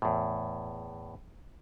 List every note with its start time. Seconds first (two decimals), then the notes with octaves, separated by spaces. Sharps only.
0.02 E2 A2